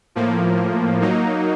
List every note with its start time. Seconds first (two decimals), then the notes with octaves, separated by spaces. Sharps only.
0.15 A2 F3 A#3
1.02 F#3 A#3 D#4